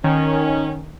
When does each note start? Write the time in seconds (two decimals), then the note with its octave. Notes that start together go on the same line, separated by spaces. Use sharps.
0.04 D#3 C#4